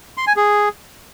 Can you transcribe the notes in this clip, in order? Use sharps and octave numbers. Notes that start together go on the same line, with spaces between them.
C6
G#5
G#4